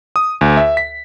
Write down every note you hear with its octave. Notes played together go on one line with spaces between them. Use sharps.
D#6
D2
E5
B6